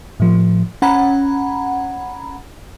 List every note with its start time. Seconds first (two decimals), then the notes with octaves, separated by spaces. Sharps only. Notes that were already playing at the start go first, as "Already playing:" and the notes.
0.20 A2 F3
0.82 C#4 F#5 A#5 B5